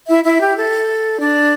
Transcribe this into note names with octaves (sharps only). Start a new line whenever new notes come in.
E4 E5
E4 E5
G4
A4
D4 D5